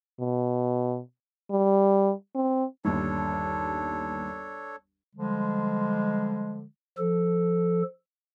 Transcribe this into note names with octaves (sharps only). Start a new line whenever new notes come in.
B2
G3
C4
G1 D#2 D4 A4 C#5
D3 F3 G3 G#3
F3 A4